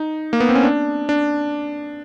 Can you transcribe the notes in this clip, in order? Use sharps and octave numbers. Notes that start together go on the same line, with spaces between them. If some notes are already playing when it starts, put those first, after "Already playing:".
Already playing: D#4
A#3
B3
C4
C#4
D4
D4